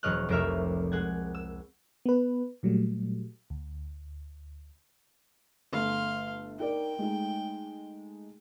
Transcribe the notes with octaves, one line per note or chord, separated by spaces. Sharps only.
E1 F#3 C#5 D#5 F6 F#6
F1 C2 A#4 C#5 E5 F6
G#3 F#5 G#6
E6
B3 B4
A#2 F#3 G3 A3
D2
G1 A3 A4 F5 C6
D#4 A#4 D5 G5
G#3 A3 D#4